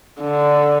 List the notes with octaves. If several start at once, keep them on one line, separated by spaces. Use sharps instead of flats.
D3